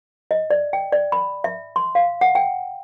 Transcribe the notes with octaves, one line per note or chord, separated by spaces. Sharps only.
D#5
D5
G5
D5
B5
E5
C6
F5
F#5
G5